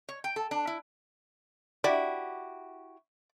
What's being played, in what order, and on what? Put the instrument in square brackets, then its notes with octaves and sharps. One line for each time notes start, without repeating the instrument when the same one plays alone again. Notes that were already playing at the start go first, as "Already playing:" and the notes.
[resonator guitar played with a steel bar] C#5
G5
A4
D4
E4
[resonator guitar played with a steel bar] E4 F#4 G4 [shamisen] D5